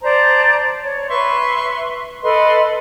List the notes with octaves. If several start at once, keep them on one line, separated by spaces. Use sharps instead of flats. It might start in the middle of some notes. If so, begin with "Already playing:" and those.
C5 D5 A5 A#5
C#5
B4 E5 C6 C#6
A4 B4 D#5 C6